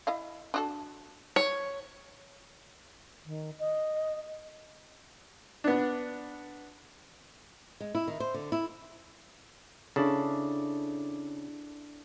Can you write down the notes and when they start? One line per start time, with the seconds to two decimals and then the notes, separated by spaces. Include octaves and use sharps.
0.07 E4 D#5 F5
0.54 D4 F#4 A4
1.36 C#5
3.26 D#3
3.59 D#5
5.64 B3 D4
7.80 G#3
7.95 E4
8.08 D#3
8.20 C5
8.34 D3
8.52 E4
9.96 C#3 D4 E4 A4